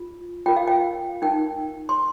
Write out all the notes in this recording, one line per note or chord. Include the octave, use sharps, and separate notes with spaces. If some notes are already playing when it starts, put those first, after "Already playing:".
Already playing: F4
F4 A#4 G5
F5
G5
D#4 A#4 G5
C6